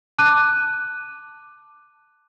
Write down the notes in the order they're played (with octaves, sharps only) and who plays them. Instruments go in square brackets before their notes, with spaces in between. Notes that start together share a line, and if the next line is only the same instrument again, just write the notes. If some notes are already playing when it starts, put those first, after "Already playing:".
[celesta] A5 D6 F#6 D#7